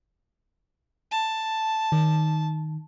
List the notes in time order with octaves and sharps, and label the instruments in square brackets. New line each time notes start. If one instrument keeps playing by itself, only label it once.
[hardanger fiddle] A5
[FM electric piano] D#3